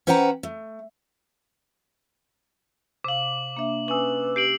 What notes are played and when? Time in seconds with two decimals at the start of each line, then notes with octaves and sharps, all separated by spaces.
0.07 C#4 B4 C5 F#5 G5 A#5
0.43 A3
3.04 C3 F5 D6 F#7
3.57 A#3 D4 E5
3.88 C#4 B4 G#5 D#6 E6 F#7
4.36 G4 C7 D7 F#7